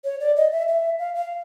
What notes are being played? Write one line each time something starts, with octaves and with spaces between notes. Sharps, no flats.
C#5
D5
D#5
E5
E5
F5
F5